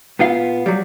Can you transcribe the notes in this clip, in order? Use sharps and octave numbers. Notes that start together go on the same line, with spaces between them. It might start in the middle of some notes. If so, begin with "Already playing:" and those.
A#2 B3 F4 F5
F#3 G3